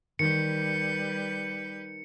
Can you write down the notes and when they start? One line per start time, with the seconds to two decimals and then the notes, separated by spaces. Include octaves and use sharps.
0.19 D#3 G3 B4 G6 C#7